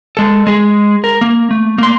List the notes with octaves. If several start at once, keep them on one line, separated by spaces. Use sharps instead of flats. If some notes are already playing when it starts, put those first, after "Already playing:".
G#3 A4
G#3 G#4
A#4
A#3
A3
A#3 C6